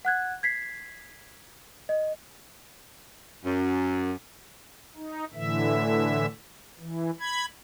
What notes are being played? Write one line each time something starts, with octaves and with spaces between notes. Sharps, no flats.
F#5 F#6 G#6
G#6 B6 C7
D#5
F#2
D#4
A2 D3 E3 E5
E3
B5 G#6